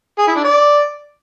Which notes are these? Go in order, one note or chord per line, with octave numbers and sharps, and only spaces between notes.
G#4
E4
D4
D5